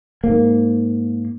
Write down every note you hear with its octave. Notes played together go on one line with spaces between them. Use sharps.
G#2 A#3